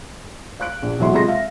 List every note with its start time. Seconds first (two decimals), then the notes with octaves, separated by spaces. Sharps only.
0.60 F5 F#6 D7
0.82 A#1
0.98 B1 E3 F#3 G#3 E5 C6
1.12 C3 G#3 A3 F4 C6 A#6
1.28 E5 F5